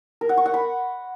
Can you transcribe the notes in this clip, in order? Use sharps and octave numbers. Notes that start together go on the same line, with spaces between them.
A#4
F#5
C#6
F#5
B5